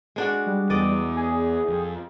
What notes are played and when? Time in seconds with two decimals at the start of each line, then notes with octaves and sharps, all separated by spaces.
0.16 G#3 D4 F#4
0.46 G3
0.70 E2 D5 D#5
1.16 G#4
1.68 F2